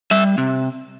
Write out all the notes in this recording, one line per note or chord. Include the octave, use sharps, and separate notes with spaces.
G3 E5
C3